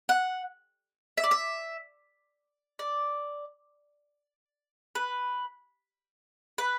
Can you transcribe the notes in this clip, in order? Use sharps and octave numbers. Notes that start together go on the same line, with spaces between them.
F#5
E5
D5
E5
D5
B4
B4